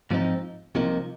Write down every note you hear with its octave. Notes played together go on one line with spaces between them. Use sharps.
G#2 F3 C4 D#4
C2 C3 F3 A#3 D#4